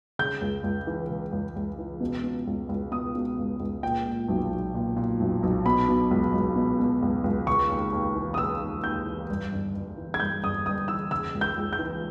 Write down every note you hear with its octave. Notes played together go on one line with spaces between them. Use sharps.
C#3 G6
C#2
C#2
E3
C#3
C#2
C#2
E3
B2
B2
C#2
C#2
B2 D#6
B2
C#2
C#2
A#2 G5
A#2
B1
B1
A#2
A#2
B1
B1
B2 B5
B2
C#2
C#2
B2
B2
C#2
C#2
C#3 C#6
D#2
D#2
E3
D#6
C#3 E6
D#2
D#2 G6
E3
G2
G1
G1
E3
G#6
G2 G6
G1 D#6
G1 D#6
E3 E6
C#3 E6
C#2
G6
C#2
G6
E3